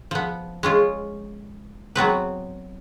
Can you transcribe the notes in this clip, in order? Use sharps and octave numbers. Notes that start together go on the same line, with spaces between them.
F3 B3
G#3 C#4 F4
F#3 B3 C4 B4